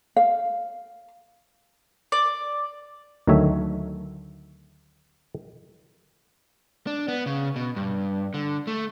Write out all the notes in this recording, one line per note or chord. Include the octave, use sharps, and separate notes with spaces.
F5
D5
D2 D#3 F#3 A3 C#5 E5
D4
B3
C#3
B2
G2
D3
A3